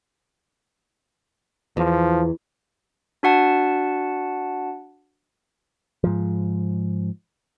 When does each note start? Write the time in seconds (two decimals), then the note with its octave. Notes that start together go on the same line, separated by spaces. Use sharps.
1.77 E2 F3
3.23 D4 F#4 F#5 A5
6.04 G#2 F3